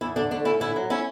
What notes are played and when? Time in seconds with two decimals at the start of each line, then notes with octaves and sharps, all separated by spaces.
0.01 E2 E4
0.16 D3 D4
0.31 A3 D4
0.45 C#4 E4
0.60 D3 E4
0.76 F#3
0.90 C#4 E4